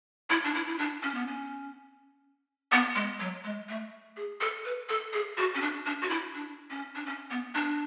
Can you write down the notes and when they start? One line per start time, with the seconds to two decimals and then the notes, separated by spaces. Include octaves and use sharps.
0.30 E4
0.44 D4
0.54 E4
0.67 E4
0.78 D4
1.03 C#4
1.14 B3
1.27 C#4
2.72 B3
2.95 G#3
3.20 F#3
3.44 G#3
3.69 A3
4.17 G#4
4.41 A4
4.65 B4
4.89 A4
5.13 G#4
5.37 F#4
5.55 C#4
5.61 D4
5.86 D4
6.02 F#4
6.10 E4
6.34 D4
6.70 C#4
6.95 D4
7.06 C#4
7.31 B3
7.55 D4